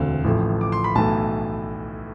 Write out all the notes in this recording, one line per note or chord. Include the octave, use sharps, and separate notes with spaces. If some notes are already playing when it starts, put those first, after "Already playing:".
Already playing: E1 D2 D3 A3 C4 F5
A1 A2 F3 A3
D6
C6
B5
B1 A2 E3 A3 A5